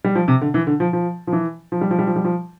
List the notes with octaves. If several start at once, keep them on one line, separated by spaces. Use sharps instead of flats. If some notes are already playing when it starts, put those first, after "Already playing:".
G3
F3
C3
D3
E3
D3
F3
F3
F3
E3
F3
G3
F3
G3
F3
G3
F3